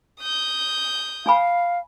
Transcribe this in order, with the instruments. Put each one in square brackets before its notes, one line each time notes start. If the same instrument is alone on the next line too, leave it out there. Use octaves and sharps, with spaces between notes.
[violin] D#6 G6
[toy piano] D4 G#5 B5 [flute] F5